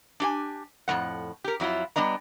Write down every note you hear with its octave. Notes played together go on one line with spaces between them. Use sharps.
D4 G4 G#5
F2 A2 G#3 F#5
G4 A#4
F2 F#3 E4 F4
G3 B3 D4 D#5 A#5